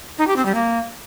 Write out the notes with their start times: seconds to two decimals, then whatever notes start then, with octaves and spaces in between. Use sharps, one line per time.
0.18 D#4
0.27 G4
0.36 C4
0.45 G3
0.54 A#3